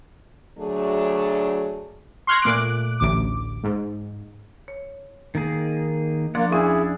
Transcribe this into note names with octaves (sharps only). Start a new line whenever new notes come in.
D2 F#3 A3 D4 G#4
C6 C#6 F6 F#6 G#6 A#6
A#2 A3 D6 F#6 D7
A1 D2 D6
G#2
C#5
D#3 A#3 G#4
F3 A#3 D4 D5 F#5 C6
E2 C#4 E4 G#4 E5